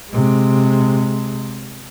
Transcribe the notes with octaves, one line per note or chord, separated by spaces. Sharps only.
C3 G#3